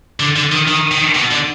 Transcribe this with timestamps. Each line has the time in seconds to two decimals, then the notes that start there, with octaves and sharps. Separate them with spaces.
0.20 D3
0.36 D3
0.52 D#3
0.68 D#3
0.91 D#3
1.15 B2
1.31 D3